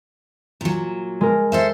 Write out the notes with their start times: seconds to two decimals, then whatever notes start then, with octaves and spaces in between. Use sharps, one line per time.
0.61 A#2 F#3
1.21 G#3 A#4
1.52 A4 C5 E5